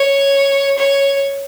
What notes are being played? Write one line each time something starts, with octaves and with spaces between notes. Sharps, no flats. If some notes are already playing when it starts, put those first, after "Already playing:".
Already playing: C#5
C#5